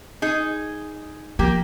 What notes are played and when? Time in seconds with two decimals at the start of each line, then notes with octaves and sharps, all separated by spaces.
0.22 D#4 G#4
1.39 F3 A#3 G4